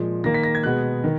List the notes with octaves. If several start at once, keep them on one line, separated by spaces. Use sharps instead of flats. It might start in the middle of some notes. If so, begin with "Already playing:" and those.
Already playing: A#2 F3 G#3
D#3 A#3 A#6
B6
A#6
G#6
B2 G#3 B3 F#6
D#3